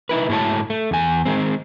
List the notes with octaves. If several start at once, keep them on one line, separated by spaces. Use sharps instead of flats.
D#4 E4 B4
G#2 A3 E4 F#4 C#5 A5
A3
E2 G#5
D#3 G#3 C4